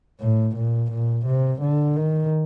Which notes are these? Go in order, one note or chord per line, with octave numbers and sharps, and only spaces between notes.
A2
A#2
A#2
C3
D3
D#3